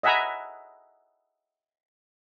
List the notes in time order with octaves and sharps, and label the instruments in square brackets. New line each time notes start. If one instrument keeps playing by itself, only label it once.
[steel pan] D#5 E5 F#5 G#5 A#5 B5